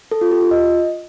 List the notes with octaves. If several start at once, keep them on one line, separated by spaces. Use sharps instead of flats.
A4
F4
G4
F4
D#5